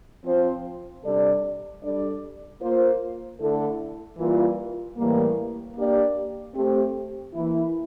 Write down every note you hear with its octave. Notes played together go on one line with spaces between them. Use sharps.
F3 C4 F4 C5
C3 G3 D4 A4 D5
G3 D4 A4 D5
A#3 F4 C5
D3 A3 E4 A4
E3 G3 A#3 F4
A2 E3 G3 A#3
A#3 D4 G4 D5
A3 C4 G4
E3 A#3 E4